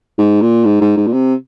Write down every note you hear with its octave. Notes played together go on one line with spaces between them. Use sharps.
G#2
A#2
G#2
G#2
G#2
A#2
C3